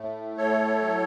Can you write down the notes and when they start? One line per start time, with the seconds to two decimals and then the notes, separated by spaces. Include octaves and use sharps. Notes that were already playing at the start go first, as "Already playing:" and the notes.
Already playing: A2 A3
0.37 A2 A4 C#5
0.82 F#3